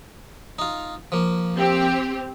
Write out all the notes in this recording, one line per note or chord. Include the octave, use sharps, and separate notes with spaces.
D#4 F4
F3 A#3
C4 G4